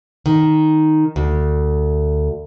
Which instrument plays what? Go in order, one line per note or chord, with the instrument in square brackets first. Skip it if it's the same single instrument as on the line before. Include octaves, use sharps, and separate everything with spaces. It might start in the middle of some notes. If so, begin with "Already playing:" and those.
[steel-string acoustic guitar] D#3
D2